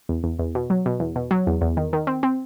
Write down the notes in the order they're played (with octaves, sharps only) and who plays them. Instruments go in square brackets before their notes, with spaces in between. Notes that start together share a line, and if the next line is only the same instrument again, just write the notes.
[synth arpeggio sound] E2
E2
E2
B2
F#3
B2
E2
B2
F#3
E2
E2
D#3
D#3
C4
C4